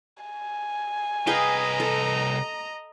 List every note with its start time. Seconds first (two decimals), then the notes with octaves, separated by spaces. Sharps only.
0.23 G#5
1.27 C2 G#4 B4 D#5 F5 G5 A#5
1.80 A4